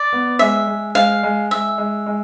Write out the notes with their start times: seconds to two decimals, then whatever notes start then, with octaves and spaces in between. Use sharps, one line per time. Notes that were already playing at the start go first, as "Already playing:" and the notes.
Already playing: D5
0.13 B3
0.39 G#3 E5
0.67 G#3
0.95 G#3 F5
1.23 G#3
1.51 G#3 E5
1.78 G#3
2.06 G#3